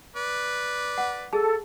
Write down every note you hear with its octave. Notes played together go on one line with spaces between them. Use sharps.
B4 D5
F#5
G#4 A4 A5